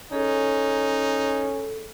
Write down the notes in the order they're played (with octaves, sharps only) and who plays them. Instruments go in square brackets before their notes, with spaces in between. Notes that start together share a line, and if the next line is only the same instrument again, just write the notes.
[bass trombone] C#4 [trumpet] D#4 [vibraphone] G#4 A4